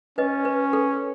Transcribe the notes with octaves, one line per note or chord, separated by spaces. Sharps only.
C#4 B4 D#5
B4
A4